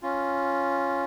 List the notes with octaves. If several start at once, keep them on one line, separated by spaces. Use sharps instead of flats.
C#4 F4